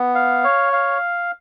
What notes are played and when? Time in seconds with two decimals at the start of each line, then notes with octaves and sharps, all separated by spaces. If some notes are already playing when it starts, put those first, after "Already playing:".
Already playing: B3
0.15 F5
0.44 C#5
0.73 F5